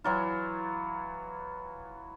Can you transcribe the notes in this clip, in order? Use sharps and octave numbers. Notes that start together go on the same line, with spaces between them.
E3 F#3 F4